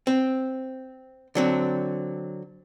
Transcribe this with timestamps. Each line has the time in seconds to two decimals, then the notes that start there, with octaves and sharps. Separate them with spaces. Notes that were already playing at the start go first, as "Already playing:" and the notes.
0.07 C4
1.35 D3 F#3 C4